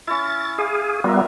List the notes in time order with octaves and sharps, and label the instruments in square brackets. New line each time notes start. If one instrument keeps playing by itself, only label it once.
[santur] C#4 E4 [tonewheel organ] A6
[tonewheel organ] G#4 [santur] F5
[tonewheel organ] G3 B3 [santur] F4 A#4 E5